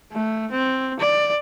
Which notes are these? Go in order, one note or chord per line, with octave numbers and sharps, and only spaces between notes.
A3
C4
D5